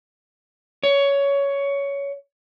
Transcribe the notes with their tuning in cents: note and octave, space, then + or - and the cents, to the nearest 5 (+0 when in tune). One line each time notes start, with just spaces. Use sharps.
C#5 +15